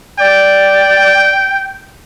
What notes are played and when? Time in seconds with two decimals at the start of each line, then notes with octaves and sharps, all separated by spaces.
0.19 D5 G5